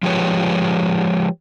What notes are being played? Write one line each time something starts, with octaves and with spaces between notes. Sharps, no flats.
F3 G#3 G4 B4 C#5